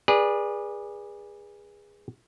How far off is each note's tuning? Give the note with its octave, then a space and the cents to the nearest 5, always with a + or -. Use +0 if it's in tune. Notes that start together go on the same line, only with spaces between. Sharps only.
G#4 -20 B4 -30 D5 +0